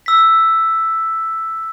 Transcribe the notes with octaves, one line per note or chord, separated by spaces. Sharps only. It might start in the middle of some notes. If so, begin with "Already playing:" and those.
E6 B6